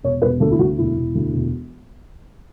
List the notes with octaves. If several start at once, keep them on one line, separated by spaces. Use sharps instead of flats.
E1 C#5
E1 B4
D2 A4
E4
D2 F#4
E1 E4
E1
D2
E1